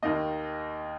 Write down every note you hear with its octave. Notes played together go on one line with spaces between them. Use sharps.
D#2 D#3 A#3 D#5